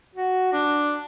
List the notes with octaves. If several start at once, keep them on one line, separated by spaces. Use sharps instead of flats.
F#4
D4